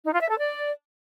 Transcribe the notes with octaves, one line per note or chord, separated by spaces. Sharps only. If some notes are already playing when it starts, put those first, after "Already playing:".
D#4
F4
E5
A4
D5